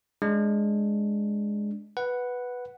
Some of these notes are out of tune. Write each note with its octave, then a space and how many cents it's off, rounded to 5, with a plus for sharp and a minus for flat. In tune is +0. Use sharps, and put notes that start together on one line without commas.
G#3 +0 D4 +0
B4 +0 F#5 +0